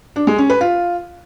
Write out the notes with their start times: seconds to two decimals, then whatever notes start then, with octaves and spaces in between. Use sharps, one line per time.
0.16 D4
0.27 G#3
0.38 C#4
0.50 B4
0.61 F4